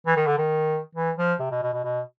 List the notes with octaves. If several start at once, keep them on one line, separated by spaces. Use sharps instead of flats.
E3
D#3
D3
D#3
E3
F3
C3
B2
B2
B2
B2